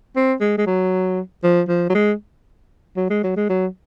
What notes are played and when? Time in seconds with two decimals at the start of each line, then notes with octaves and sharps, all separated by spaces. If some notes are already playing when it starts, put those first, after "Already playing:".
0.16 C4
0.41 G#3
0.58 G#3
0.67 F#3
1.43 F3
1.68 F3
1.90 F#3
1.95 G#3
2.96 F#3
3.10 G#3
3.24 F#3
3.36 G#3
3.49 F#3